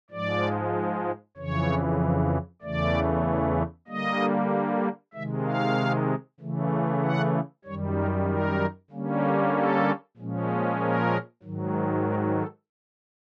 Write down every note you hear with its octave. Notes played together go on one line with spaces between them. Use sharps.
G#2 F3 G#3 D5
F2 C#3 E3 C#5
E2 C#3 E3 A3 D5
D3 G3 A#3 D#5
C3 D#3 G#3 E5
F5
C#3 E3 A3
F#5
F#2 D#3 G3 C#5
A#4
A#4
D3 G3 A#3 C#4
A4
A#2 F3 G#3 C#4
A#4
G#2 D#3 F#3
A#4
A4